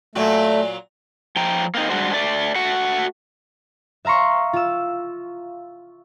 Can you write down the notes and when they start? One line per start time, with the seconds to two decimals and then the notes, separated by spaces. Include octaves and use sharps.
0.15 A#2 F#3 A3 F#4
1.36 F3 G5 A#5
1.75 A#3 C4 D#4
1.90 G3 G#3 D4 F#4 C5
2.13 A3 D5
2.55 A3 F#4 F#5
4.05 E5 F5 A#5 C6 C#6
4.53 F4 E6